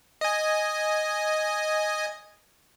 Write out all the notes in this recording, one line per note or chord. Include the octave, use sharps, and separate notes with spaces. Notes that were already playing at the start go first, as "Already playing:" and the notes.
D#5 G#5